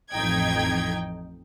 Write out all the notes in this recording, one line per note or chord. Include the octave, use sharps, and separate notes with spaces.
A1 F2 D#4 G5 G#6